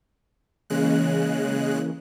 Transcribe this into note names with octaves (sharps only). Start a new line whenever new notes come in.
C#3 E3 G#3 A#3 C#4 F#6